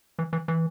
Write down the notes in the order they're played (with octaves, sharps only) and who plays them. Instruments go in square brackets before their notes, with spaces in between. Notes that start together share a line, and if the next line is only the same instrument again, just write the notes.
[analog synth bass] E3
E3
E3